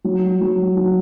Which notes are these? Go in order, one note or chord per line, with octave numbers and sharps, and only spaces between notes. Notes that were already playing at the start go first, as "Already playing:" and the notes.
F#3
F#3
F#3